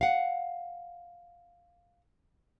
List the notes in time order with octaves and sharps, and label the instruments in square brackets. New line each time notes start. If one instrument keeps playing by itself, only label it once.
[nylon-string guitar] F5 F#5